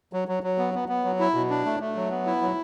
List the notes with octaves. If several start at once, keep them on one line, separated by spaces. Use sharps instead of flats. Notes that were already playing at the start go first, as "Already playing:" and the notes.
F#3
F#3
F#3
B3
B3
B3
F#3
E4
B2
D4
A3
A3
F#3
B3
E4
F#3